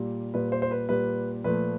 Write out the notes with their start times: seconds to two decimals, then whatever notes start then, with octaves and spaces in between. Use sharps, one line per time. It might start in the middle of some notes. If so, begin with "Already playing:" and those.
Already playing: A#2 G3
0.34 A#2 G3 B4
0.52 C5
0.62 C5
0.71 B4
0.89 A#2 G3 B4
1.44 A#2 F3 A3 B4